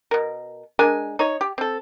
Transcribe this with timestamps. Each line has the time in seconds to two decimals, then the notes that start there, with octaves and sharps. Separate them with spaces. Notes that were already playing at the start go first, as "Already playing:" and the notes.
0.11 B2 A#4
0.79 G#3 D4 A#4 G#5
1.19 D#4 C#5
1.41 G4
1.58 C4 A4